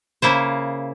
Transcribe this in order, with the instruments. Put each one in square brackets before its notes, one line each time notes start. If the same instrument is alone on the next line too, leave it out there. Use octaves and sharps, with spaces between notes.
[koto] C#3 A#3 E4 C5